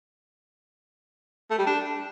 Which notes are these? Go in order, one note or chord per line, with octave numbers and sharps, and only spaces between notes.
A3
G3
D4